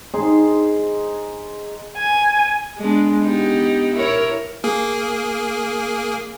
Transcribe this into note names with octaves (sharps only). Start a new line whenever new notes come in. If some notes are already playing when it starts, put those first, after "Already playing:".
D#4 G#4 C5
G#5
G#3 B3 D4
B3 D#4 G4
E4 A#4 C#5
A#3 G#4